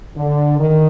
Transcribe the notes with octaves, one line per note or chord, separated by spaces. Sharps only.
D3
D#3